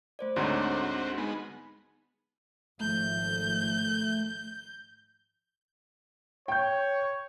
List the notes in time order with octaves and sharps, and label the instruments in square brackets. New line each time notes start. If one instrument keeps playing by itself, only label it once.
[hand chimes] A3 C5 D5
[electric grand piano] D2 G#2 D3 [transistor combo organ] C4 F#4 [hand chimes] C#5 A#5 C6
[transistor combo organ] G#3 B3 [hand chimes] D#4
[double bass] G#1 F3 [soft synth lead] A3 [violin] G6
[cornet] C#5 [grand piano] G5 G6